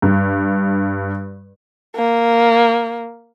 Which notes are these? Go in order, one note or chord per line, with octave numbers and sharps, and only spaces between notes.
G2
A#3